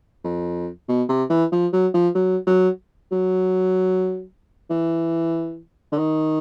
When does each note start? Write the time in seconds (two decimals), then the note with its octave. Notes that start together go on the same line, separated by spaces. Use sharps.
0.24 F2
0.88 B2
1.08 C3
1.30 E3
1.52 F3
1.73 F#3
1.94 F3
2.15 F#3
2.47 F#3
3.12 F#3
4.70 E3
5.92 D3
5.98 D#3